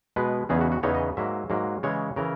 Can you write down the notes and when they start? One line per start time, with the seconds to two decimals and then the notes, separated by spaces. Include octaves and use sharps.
0.16 B2 G#3 B3 B4
0.49 E2 C#3 E3 B3 D#4 G#4
0.61 F#4
0.72 F#4
0.83 E2 C#3 E3 B3 D#4 C#5
0.95 D#5
1.17 G#2 F#3 A#3 E5
1.50 G#2 F#3 A#3
1.83 C#3 E3 G#3 C#5
2.16 C#3 E3 A#4